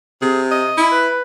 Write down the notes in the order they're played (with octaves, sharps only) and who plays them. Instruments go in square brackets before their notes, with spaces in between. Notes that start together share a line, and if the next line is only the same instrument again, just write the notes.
[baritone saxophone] C3 [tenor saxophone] G#4
[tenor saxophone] D#5
[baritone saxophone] E4
[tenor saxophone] B4